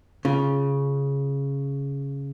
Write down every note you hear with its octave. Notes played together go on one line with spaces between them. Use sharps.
C#3 F4